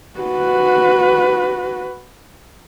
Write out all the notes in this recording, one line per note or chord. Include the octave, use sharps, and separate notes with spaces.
F#4 B4